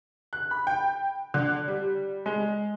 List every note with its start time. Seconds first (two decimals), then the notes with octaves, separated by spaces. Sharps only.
0.33 F#6
0.51 B5
0.67 G5
1.34 D3
1.68 G3
2.26 G#3